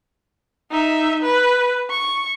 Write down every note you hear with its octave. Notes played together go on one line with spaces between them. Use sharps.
D#4 E5
B4
C#6